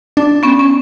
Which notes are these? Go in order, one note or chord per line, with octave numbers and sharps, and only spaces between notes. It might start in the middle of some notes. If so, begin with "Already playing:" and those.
D4
B3 C#4
C#4